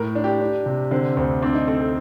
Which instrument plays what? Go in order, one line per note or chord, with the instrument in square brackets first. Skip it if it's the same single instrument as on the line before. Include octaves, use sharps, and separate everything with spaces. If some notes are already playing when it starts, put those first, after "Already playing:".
Already playing: [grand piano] A2 [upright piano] A#4
[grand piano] D4
[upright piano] G4
[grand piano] D4
C3
[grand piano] D3 [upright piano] C4
[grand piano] D2 [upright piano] C4
[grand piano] C4 [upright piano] D4
[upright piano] D#4
[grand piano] C4 [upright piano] A4
[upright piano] A4